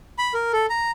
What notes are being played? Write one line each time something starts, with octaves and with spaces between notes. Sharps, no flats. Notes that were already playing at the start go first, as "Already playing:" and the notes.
B5
A#4
A4
A#5